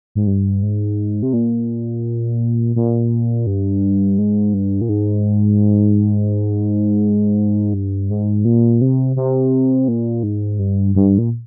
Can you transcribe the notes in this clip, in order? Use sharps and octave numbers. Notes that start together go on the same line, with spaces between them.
G#2
G2
G#2
C3
A#2
A#2
G2
G#2
G2
A#2
G#2
G2
G#2
A#2
C3
C3
A#2
G#2
G2
G2
A#2